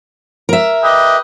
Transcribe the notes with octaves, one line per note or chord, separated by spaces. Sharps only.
A#4 E5
G4 B4 D#5